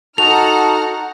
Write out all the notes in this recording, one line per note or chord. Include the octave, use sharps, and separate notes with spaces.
D#4 F#4 A4 F#5 A5 A#5 F6 F7